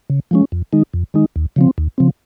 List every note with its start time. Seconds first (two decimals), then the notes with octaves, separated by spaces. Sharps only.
0.10 C#3
0.31 F3 G#3 C#4
0.52 F2
0.73 D#3 G#3 D#4
0.93 F2
1.14 D#3 G#3 D#4
1.36 D#2
1.56 C#3 F3 C4
1.78 D#2
1.98 C#3 F3 C4